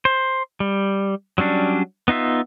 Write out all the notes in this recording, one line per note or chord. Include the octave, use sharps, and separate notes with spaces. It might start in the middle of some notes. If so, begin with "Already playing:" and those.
C5
G3
F#3 G3 C#4 D4
B3 D#4 F4 E5